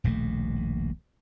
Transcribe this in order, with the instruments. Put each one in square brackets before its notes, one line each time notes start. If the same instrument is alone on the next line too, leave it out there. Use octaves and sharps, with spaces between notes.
[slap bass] D#1 A#1 B2 A3